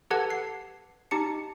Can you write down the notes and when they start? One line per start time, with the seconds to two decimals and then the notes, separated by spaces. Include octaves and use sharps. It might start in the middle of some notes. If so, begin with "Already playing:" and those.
0.11 G4 A4 B4 F#5 A5 G#6
0.30 C7
1.11 D#4 G4 A5 C#7